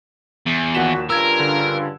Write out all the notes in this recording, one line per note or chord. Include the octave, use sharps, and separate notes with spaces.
E2
D#2 A#2 F#4 B6 E7
G2 C#3 F4 A#4 E6 G#6 D7
D3